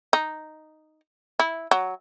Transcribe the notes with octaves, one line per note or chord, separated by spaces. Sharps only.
D#4
E4
F#3